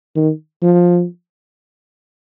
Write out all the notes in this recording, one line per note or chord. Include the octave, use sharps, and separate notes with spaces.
D#3
F3